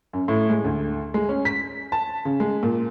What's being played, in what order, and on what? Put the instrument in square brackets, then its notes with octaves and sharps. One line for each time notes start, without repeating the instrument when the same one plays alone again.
[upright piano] F#2
A2
G#3
D2
G#3
C#4
B6
A5
C#3
G#3
A#2